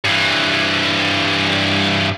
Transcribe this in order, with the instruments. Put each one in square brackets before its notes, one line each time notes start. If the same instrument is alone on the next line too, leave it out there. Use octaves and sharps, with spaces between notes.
[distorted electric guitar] G2 E3